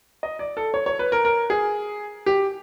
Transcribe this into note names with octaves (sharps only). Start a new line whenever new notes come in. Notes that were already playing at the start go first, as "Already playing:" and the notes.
D#5
D5
A4
C#5
C#5
B4
A#4
A#4
G#4
G4